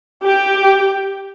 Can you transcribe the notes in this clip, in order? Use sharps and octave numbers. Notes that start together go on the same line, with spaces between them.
G4 G5